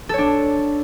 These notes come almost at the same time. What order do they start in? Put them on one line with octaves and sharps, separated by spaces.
A4 C#5 D4